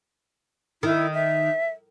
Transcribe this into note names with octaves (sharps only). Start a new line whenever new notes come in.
D#3 E4
E5